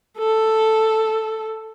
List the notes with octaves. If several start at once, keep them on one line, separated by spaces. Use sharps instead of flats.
A4